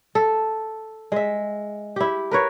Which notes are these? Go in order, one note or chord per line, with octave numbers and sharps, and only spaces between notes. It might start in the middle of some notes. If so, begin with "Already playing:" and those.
A4
G#3 E5
E4 G4
A#4 B4 C#5